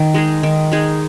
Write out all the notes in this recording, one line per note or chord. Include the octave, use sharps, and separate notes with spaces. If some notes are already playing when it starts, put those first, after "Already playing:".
Already playing: D#3
G#3 D#4 G#4
D#3
G#3 D#4 G#4